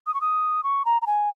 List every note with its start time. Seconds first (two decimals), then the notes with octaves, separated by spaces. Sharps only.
0.07 D#6
0.14 C#6
0.21 D#6
0.64 C#6
0.85 A#5
1.02 A#5
1.07 G#5